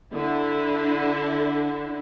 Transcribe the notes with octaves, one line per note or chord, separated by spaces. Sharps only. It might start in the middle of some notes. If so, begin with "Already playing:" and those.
D3 E4